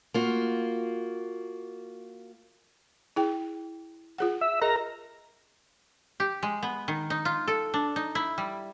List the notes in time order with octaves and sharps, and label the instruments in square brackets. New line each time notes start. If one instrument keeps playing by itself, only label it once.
[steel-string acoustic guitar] A#3 F4 F#4
[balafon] E4 G#4 G5
F4 G#4 F#5
[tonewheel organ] E5
[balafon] G#4 D#5 [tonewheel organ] A#4 A#5
[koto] G4
G#3
B3
D#3
D#4
F4
A4
D4
D#4
E4
G3